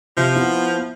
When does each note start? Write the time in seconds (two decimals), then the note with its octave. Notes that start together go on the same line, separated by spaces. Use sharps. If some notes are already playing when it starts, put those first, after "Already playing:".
0.17 C3 F3 E5
0.35 B3 E4